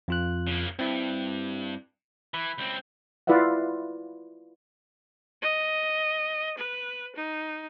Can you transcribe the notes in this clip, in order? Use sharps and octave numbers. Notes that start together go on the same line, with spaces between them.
F2 F4 F#6
C#3 A#3
G2 C4 E4
E3 B5
C#2 C4
E4 F4 B4 D5 E5 F#5
D#5
B4
D#4